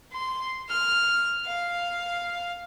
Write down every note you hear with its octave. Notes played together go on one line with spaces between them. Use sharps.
C6
F6
F5